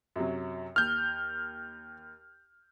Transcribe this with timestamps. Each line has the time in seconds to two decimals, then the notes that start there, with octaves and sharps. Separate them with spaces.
0.16 F#2 C3 F#3
0.76 D#2 F6 G6